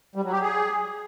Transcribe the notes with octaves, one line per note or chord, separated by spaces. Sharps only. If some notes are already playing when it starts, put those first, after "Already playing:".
G3
F#3
G4
G#4